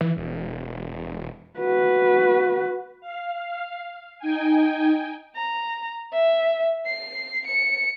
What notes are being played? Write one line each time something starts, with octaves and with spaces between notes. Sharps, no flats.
E3
E1
F#4 B4
F5
D#4 G5 G#5
A#5
E5
C7
C#7